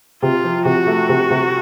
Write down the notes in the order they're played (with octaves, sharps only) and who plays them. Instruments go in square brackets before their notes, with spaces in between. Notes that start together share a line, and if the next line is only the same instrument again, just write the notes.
[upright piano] C3 [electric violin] F4
[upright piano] F3
[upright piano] C3 [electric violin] F#4
[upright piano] A3
C3
C3